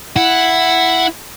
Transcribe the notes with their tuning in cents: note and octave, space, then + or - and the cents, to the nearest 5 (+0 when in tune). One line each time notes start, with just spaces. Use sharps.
E4 +5 F#5 +0